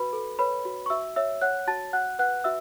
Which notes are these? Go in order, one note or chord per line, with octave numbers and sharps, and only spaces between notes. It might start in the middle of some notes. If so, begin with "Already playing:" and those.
Already playing: F#4 B4 B5
A4
B4 C#5 B5
F#4
C#6
F#4 E5 E6
C#5 E5 E6
C#5 F#5 F#6
F#4 A5 A6
F#4 F#5 F#6
B4 F#5 F#6
F#4 E5 E6